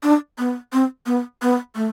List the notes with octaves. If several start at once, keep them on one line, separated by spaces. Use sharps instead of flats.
D4
B3
C4
B3
B3
A3